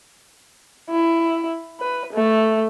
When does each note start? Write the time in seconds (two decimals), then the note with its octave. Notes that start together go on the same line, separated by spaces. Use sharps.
0.91 E4
1.80 B4
2.13 A3